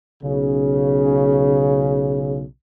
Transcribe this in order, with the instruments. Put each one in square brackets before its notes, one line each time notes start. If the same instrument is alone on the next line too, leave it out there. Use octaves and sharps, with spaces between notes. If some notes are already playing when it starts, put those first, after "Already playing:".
[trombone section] B1 C#3